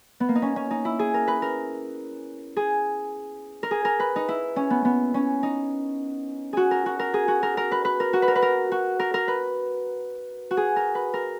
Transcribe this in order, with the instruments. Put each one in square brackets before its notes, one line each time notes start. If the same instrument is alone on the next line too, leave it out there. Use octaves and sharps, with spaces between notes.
[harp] B3
A#3
D#4
C#4
C#4
D#4
E4
G#4
A#4
B4
A#4
G#4
A#4
G#4
A#4
B4
D#4
E4
C#4
B3
B3
C#4
D#4
F#4 G#4
A#4
F#4
A#4
G#4
F#4
A#4
A#4
B4
B4
A#4
F#4
B4
A#4
B4
A#4
F#4
A#4
A#4
B4
F#4
G#4
A#4
B4
A#4